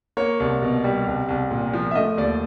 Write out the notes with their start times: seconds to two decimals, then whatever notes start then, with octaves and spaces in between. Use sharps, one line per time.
0.17 A#3 C#5
0.40 C2
0.62 B2
0.84 G3
1.07 C2
1.29 C2
1.51 A#2
1.73 F3
1.91 E5
1.95 A3 D#5
2.17 D#2 D5